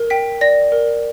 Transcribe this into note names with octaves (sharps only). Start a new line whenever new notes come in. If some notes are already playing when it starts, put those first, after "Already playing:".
Already playing: A#4
G5 B6
D5 A#6
A#4